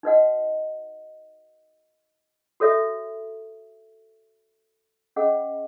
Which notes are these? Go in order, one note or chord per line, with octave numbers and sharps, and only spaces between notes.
D#4 F#4 B4 D#5 F#5
F#4 A4 C#5 E5
C#4 G#4 D#5 F#5